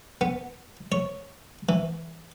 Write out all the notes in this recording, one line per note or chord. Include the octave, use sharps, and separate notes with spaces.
B3
C#5
E3